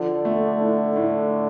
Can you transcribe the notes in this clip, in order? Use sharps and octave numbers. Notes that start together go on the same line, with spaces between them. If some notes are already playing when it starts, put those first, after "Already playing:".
Already playing: D3 F3
A3
A2
A2